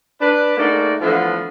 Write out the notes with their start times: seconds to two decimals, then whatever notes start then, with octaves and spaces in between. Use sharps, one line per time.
0.20 D4 B4
0.57 G#2 A3 A#3 D#4 F#4 D5
1.01 D3 E3 F3 A3 B3 F4